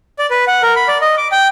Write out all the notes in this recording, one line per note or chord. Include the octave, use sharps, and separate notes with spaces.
D5
B4
F#5
A#4
B5
D5
D#5
D6
G5